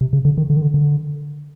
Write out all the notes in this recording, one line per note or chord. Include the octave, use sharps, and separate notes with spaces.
C3
C#3
D3
D#3
D3
D#3
D3
D3